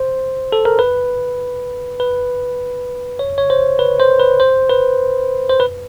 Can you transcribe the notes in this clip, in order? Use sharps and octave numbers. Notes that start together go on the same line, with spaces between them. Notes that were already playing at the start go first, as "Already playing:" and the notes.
Already playing: C5
A4
A#4
B4
B4
C#5
C#5
C5
B4
C5
B4
C5
B4
C5
B4